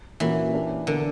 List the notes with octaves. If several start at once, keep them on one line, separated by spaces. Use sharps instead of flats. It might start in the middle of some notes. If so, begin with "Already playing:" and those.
A#2 E3 A#3 C#4 F#4
A#3 D4 G4 A#4
B2 D3 A#3 D4 A#4